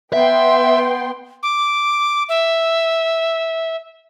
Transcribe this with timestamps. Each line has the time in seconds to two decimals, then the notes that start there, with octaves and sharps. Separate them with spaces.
0.13 B3 E5 G5 C6
1.43 D6
2.29 E5